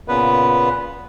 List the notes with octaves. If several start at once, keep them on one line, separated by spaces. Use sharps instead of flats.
A#2 C#3 B3 B4